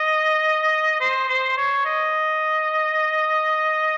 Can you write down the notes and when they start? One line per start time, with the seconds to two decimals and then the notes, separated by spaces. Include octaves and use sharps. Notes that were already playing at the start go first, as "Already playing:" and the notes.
Already playing: D#5
1.01 C5
1.29 C5
1.57 C#5
1.86 D#5